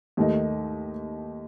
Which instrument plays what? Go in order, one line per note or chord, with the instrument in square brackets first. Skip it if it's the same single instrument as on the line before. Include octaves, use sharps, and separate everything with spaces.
[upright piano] D#2 D#3 A3 D#4